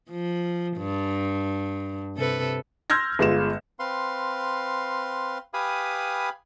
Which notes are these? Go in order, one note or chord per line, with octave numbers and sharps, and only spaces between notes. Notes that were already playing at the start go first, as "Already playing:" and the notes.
F3
G2
C3 A4 B4
C6 E6 F6 G6 G#6 A#6
G1 G#3 F4 E7
C4 B4 F5 C6
G4 B4 F5 G#5 B5 D#6